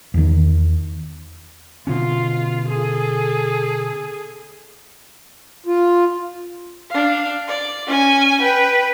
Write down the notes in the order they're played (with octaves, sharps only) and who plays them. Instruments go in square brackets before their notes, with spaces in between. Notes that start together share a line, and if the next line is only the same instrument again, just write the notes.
[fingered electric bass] E2 D#3
[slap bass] B2 D3 C#4 [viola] F4
[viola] G#4 A4
[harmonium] F4
[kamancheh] D4 F5
D5
C#4 G#5
B4 G5